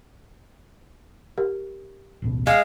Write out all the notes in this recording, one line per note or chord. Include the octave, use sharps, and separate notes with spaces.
G4 A#4
D1 A1 B2
G#3 F5